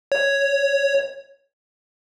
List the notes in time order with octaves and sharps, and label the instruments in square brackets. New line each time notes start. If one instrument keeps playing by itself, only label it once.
[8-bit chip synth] C#5